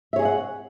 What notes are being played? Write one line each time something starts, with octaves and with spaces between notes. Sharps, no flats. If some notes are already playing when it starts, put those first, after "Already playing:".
G#4 C#5 D#5 E5 F#5